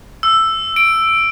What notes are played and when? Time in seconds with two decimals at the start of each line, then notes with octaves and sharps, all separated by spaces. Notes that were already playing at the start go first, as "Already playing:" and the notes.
0.23 E6
0.76 D7